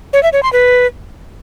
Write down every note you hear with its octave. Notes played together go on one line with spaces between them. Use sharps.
C#5
E5
C#5
C6
B4